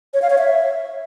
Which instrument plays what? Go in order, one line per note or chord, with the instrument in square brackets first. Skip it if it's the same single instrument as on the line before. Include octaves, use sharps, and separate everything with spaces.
[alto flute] C#5
F5
C#5
E5